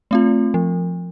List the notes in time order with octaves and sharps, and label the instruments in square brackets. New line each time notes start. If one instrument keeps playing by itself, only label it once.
[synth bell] A3 C4 F4
F3